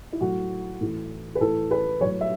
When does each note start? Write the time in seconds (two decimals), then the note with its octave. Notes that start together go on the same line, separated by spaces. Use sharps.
0.13 E4
0.21 A2 F#3 F#4
0.81 A2 E3
1.35 B4
1.41 A2 E3 A4
1.71 B4
2.01 F#3 C#5
2.05 A2
2.21 E5